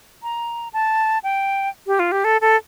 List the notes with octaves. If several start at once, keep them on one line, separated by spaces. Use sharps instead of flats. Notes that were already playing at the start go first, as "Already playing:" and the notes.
A#5
A5
G5
G4
F4
G4
A4
A4